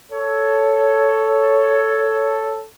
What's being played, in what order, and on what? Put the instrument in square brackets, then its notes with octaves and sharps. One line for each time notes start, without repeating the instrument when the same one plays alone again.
[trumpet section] A4 [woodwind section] C#5